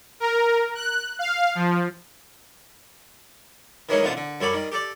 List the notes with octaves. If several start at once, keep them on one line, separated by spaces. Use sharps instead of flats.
A#4
F#6
F5
F3
D#3 E3 F#3 G#3 C#4 D#4
A1 B2 D3 C4 F4 A5
D3
F#2 G3 A4 C#5 D5 B5
D#3 G3
G4 A4 D5